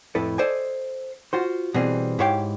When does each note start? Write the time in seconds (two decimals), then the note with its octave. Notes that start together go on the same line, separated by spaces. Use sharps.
0.15 F2 A2 E4 A4 B4
0.38 A4 C5 D5 D#5 G#5
1.33 F4 F#4 C5
1.74 B2 E3 G3 C4 G#4
2.19 G#2 E4 G4 C#5 F5 G5